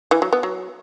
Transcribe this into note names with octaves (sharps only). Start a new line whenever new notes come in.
E3
F#3
B3
F#3